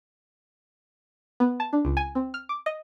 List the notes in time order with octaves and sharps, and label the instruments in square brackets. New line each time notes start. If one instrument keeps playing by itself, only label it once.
[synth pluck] B3
A5
D4
C#2
G#5
C4
F6
D6
D#5